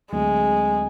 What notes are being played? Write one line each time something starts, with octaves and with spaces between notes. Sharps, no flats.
D2 D3 F#3 G#3 A3 C4